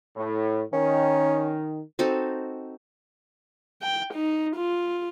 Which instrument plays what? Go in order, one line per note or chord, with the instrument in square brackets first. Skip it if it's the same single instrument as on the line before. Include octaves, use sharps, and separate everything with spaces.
[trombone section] A2
[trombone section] D#3 [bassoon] C#4
[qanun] C4 D#4 F#4 A4
[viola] G5
D#4
F4